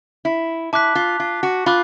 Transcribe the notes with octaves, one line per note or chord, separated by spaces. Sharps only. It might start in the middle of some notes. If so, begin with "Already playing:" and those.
E4
E4 A5 D6 F#6 B6
F4
F4
F#4
F4 B5 D6 F#6